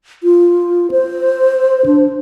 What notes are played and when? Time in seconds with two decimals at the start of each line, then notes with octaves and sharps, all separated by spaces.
0.23 F4
0.91 C5
1.86 D4